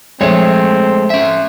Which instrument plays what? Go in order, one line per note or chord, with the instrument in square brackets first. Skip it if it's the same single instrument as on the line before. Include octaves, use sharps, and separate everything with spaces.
[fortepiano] A#1 C#5 [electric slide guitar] G#3 A3 [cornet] C4
[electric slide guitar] C#4 E5